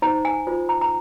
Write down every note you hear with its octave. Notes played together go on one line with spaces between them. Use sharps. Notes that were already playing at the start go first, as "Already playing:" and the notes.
D#4 C5 A#5
G#5
F4 C5
A#5
A#5